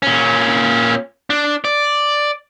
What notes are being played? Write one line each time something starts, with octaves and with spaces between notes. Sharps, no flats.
A#2 C#4
D4
D5